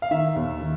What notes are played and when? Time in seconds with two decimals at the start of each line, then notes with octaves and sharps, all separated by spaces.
0.02 F5
0.11 D#3 E5
0.36 D#2
0.61 D#3